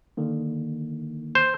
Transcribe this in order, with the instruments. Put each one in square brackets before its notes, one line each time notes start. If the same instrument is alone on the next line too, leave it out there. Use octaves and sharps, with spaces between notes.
[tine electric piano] D3 D#3 A#3
[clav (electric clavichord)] C5